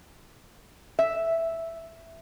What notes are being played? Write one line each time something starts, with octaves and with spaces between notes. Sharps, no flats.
E5